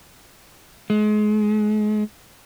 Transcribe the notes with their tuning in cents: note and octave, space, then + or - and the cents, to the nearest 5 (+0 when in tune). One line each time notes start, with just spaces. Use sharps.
G#3 +35